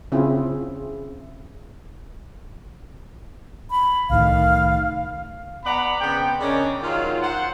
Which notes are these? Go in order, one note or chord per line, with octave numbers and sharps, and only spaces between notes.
C#3 C4 E4 F4 G#4
B5
C2 A2 D#3 F5
B3 D5 F#5 A#5 B5
C#3 B3 C4 G5
C#3 C#4 D4 A#4 D5 D#5
D#3 F#3 G#3 F4
C5 F#5